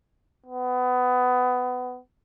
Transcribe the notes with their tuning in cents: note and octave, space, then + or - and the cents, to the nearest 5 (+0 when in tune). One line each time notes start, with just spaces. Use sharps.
B3 +20